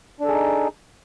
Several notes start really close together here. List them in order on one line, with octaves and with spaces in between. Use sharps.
D4 A4 G#4 D#4